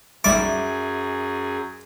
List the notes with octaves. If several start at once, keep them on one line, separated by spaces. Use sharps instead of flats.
B1 F#2 G3 G#4 E5 G5 D6 A6